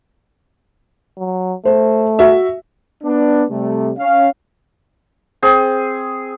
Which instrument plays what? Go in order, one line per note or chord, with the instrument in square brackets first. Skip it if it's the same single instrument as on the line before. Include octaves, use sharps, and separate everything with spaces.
[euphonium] F#3
[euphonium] A3 [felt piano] C5
[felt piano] F#4 E5
[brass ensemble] B3 D4
C3 G3 A3
C#4 F5
[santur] C4 G#4